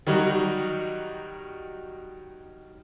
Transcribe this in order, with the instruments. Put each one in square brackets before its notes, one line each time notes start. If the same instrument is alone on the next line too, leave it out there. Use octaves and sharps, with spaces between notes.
[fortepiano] D#3 F#3 G3 D#4 F#4